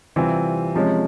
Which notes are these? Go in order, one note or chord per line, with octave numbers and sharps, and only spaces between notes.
C3 E3 G3 C4 F4
C3 F3 G#3 C#4